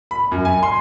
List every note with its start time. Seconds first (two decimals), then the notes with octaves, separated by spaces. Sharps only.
0.11 B5
0.32 F#2
0.45 G#5
0.63 C6